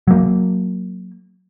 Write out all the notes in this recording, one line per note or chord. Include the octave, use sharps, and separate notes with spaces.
F#3 A#3